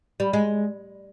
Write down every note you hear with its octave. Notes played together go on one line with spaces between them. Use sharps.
G3
G#3